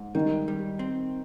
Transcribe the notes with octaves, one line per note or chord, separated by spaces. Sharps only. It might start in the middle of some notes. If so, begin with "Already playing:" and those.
Already playing: G#2
D#3 G3
G3
C4